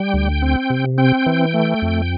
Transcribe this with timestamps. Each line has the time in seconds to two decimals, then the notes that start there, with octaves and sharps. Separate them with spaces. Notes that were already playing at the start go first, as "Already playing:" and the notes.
Already playing: G3 G5
0.14 D2
0.42 C4
0.70 C3
0.98 C4 G5
1.26 E3
1.54 A3
1.82 F2